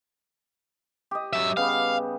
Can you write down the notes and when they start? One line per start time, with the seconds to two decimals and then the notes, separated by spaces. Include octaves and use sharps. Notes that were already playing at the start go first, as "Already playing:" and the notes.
1.11 G4 D#5
1.33 F#3 E5
1.57 C#3 G3 B3 F5